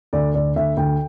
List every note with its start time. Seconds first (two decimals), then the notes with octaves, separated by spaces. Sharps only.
0.13 D2 D5
0.34 D2 D5
0.56 D2 E5
0.77 D2 G5